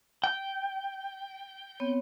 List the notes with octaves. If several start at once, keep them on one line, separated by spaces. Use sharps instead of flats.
G5
B3 C4 C#5